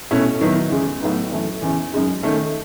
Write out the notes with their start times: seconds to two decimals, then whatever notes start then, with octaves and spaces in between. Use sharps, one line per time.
0.11 B2 A3 C#4 E4
0.41 D#3 F#3 B3 E4
0.71 E2 C#3 G#3
1.01 A2 F#3 B3 D#4
1.31 F#2 E3 A3
1.62 E2 C#3 E3
1.92 F#2 C#3 G#3 D#4
2.23 D#3 A3 C#4